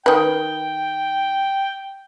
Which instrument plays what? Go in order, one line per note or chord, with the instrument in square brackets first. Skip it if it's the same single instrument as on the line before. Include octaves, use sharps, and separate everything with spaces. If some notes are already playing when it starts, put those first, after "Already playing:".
[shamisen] D#3 B4 [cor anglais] G5